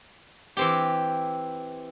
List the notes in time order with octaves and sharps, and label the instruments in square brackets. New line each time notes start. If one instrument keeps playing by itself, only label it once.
[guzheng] E3 C4 G4